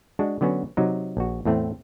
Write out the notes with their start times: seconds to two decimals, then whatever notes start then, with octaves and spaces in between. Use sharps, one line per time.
0.19 G#3 D4 F#4
0.41 D3 F#3 B3 C#4 F#4
0.77 C3 F#3 D#4
1.17 A#1 F#4
1.45 E2 A2 A3 C4